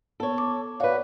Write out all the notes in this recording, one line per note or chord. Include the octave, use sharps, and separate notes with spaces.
B3 A4 C#5
D6
F#4 B4 C#5 D5 F5